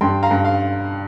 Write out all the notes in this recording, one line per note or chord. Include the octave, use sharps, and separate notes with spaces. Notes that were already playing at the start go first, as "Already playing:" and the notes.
G2 G5 C6
F5 A#5
G2
F5